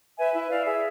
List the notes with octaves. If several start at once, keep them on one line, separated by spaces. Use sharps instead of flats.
B4 E5 G#5
E4
E4 D5 F5
G#4 E5